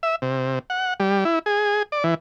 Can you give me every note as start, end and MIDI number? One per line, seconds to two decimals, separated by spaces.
0.03 0.16 76
0.22 0.59 48
0.70 0.94 78
1.00 1.24 55
1.25 1.39 64
1.46 1.83 68
1.92 2.04 74
2.04 2.14 52